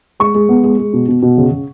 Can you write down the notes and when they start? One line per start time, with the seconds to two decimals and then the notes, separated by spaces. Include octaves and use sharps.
0.20 G#3 C#6
0.35 G#3
0.49 B3
0.63 G#3
0.79 G#3
0.93 B2
1.08 B2
1.22 B2
1.38 C#3
1.52 C#3